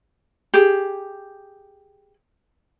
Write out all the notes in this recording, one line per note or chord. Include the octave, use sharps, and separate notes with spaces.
G4 G#4